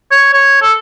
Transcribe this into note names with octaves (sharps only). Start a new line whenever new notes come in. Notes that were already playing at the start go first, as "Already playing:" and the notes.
C#5
C#5
A4